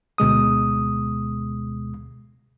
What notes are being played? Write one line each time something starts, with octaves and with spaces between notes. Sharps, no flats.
D2 B2 G#3 D#6